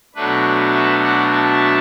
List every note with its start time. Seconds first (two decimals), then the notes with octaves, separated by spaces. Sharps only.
0.15 B2 F#3 A3 D4 B4
0.73 B4 E5
1.03 D5 F#5
1.32 E5 A5